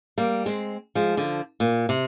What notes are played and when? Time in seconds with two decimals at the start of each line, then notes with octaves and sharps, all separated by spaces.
0.18 G3 A#3
0.46 G#3 C4
0.95 F3 G#3
1.17 D3 F3
1.60 A#2
1.89 C3